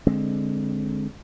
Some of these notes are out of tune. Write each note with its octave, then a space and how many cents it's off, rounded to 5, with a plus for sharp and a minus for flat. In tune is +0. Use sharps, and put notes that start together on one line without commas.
D3 +0 G#3 +0 C4 +10